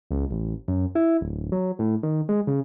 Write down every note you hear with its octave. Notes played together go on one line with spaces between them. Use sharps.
C#2
A1
F#2
E4
D1
F#3
A2
D#3
G#3
C#3